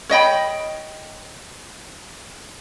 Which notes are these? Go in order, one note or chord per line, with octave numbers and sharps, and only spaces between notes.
C#5 D#5 G5 B5